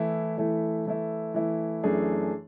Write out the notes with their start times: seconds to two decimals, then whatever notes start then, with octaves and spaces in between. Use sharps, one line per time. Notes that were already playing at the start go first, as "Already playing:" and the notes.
Already playing: E3 A3 E4
0.38 E3 A3 E4
0.86 E3 A3 E4
1.34 E3 A3 E4
1.83 F#2 E3 A3 D4 G#4